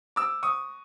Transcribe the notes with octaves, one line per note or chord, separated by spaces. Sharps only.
D6 E6
C#6 D#6